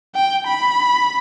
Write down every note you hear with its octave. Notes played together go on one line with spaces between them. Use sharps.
G5
B5